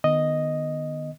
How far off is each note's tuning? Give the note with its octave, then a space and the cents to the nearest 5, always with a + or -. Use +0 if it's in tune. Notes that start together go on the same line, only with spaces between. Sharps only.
D#3 -30 B3 -5 D#5 +0